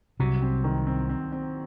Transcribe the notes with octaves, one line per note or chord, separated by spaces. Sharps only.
C2 C3 F#3
C4
D#3
C4
C4
C4